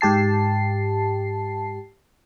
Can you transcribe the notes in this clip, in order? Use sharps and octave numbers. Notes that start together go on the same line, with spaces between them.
G#2 G4 A5 C7